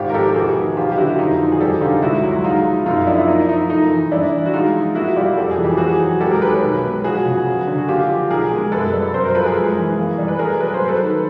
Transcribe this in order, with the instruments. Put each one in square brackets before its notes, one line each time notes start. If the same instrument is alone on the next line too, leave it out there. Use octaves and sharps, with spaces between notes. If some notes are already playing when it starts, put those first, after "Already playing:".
Already playing: [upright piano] G#1 F4 G4
A#4
F3 G4 A4
G4
E1 F#4 G#4
D#3
F#3 F4 G4
G4
D3 E4 F#4
F2 D#4 F4
D#3
G#4
G3 G4 A4
D3 D#4 F4
C#2 E4 F#4
F#3
G#3 D#4 F4
F3
F#2 D#4 F4
F3 D4 E4
E4
A#3 D#4
E4
F3 D#4
A3 D#4
E3
G3 D4 E4
E3
F#4
G#3 D#4 F4
F3
A#3 E4 F#4
G3 F4 G4
F2 A4
G#4
E3
G4
A#3 F#4 G#4
F#3
G#3 G4 A4
G#4 A#4
D#3 A4 B4
B4 C#5
B1
G#3
F3 F#4 G#4
C#3
F#3
D3
F#4
A#3 F4 G4
F3
B1 G#4 A#4
G#3
F#2 A4 B4
G3
F#2 A#4 C5
A#4 C5
F3 A4 B4
G#4 A#4
G#3
E3
A#3
G3
B4
A3 G#4 A#4
F#3 B4
C5
F#3
A4 B4
D#3